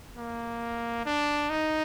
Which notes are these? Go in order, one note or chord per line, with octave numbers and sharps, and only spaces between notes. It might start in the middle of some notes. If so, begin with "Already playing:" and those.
A#3
D4
D#4